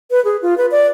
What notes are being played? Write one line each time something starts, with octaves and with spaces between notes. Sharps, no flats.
B4
G#4
F4
B4
D5